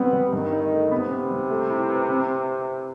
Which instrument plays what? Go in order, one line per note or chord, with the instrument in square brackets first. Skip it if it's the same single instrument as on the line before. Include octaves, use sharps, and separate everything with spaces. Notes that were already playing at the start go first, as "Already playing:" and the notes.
Already playing: [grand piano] G3 C4 [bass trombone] B3
[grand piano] G3
[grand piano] G2 [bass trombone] D#3
[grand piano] D#4
A3
[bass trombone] C3 [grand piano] B3
[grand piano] B3
G3
A3
E4
B4
C4